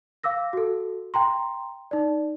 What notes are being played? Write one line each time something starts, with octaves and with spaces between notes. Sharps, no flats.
F5 D6 E6 A#6
F#4 A4
G5 A#5 C6
D#4 D5